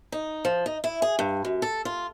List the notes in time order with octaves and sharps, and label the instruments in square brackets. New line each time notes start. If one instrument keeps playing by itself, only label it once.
[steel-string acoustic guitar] D#4
F3
D#4
E4
G#4
G2
F#2
A4
F4